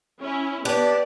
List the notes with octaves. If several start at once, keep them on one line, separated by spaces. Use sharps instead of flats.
C#4 E4
B3 D4 G4 B4 D5